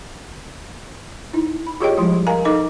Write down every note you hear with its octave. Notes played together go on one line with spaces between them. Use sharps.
D#4 E4
B5
F4 G4 G#4 C#5 D#5 G5
F3 G3 G#3 E4
A#4 D#5 F5 G#5 A#5
D#4 A4 D#5 D6